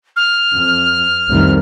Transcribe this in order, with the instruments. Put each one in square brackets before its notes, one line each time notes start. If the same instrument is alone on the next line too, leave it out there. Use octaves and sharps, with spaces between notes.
[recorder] F6
[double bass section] F2
F1 C2 D#3